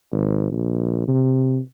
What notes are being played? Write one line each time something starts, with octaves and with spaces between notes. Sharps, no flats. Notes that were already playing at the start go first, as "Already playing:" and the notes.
G#1
A#1
C3